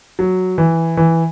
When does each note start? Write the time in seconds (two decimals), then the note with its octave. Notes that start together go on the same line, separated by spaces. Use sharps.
0.19 F#3
0.58 E3
0.97 E3